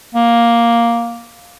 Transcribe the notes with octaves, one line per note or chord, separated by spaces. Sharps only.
A#3